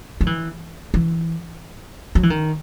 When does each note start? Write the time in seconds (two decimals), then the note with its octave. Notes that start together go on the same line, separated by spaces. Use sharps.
0.21 F#3
0.26 E3
0.94 E3
2.15 F#3
2.23 E3
2.30 D#3